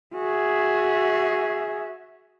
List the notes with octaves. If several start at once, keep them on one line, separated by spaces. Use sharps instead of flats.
F#4 G#4 E5